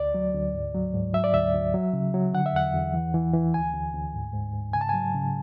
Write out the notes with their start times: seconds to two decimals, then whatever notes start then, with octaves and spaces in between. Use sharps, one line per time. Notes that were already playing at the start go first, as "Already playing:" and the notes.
Already playing: D2 D5
0.14 F#3
0.34 D2
0.54 G#2
0.74 F#3
0.94 G#2
1.14 F#3 E5
1.24 D5
1.34 D2 E5
1.54 D2
1.74 F#3
1.93 C#3
2.14 F#3
2.34 D3 F#5
2.46 E5
2.53 E2 F#5
2.75 E2
2.94 E3
3.14 E3
3.34 E3
3.54 D2 G#5
3.74 D2
3.94 D2
4.14 G#2
4.34 G#2
4.54 G#2
4.73 C#3 G#5
4.81 A5
4.89 F#3 G#5
5.14 C#3